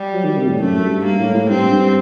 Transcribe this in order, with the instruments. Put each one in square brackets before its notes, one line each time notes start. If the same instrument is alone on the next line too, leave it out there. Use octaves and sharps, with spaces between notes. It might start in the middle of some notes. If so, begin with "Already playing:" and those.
Already playing: [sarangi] G3
[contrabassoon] F#3
D#3
C3
A2
[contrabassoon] F#2 [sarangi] A3
[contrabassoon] G2
[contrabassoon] G2 [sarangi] A#3
[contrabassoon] A2
A2
[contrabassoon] G2 [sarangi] C4
[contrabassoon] G2